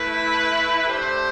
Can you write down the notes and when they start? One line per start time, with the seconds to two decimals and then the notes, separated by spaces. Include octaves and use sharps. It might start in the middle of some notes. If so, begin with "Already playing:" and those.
Already playing: A3 E4 B4
0.87 A3 D4 G4 C5